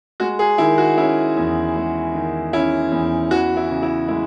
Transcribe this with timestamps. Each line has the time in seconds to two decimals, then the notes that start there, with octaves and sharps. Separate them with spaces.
0.20 G#3 F#4
0.39 G#4
0.58 D#3 E4
0.78 F#4
0.97 C#4 E4
1.37 E2
1.75 G#3
2.14 D#3
2.53 C#4 E4
2.92 E2
3.31 E3 F#4
3.57 E4
3.70 C#3
3.83 E4
4.08 G#3 E4